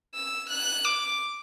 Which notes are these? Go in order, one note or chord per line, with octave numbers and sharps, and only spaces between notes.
E6
F#6
D6